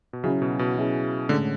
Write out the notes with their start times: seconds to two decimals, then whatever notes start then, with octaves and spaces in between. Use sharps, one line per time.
0.13 B2
0.24 C#3 F#3 C#4 E4 G#4
0.42 B2
0.59 B2
0.76 F#3 C#4 E4 G#4
1.29 A2 D3 G#3 C#4